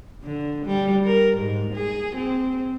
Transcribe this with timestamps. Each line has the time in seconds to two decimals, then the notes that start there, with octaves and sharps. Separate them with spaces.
0.23 D3
0.66 G3
1.05 A#4
1.37 G#2
1.74 G#4
2.16 C4